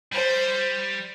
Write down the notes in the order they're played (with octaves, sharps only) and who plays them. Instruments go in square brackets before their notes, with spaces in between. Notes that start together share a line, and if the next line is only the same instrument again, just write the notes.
[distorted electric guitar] G3 [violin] C5